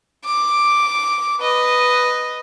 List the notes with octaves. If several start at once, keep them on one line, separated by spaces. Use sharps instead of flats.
D6
B4 D#5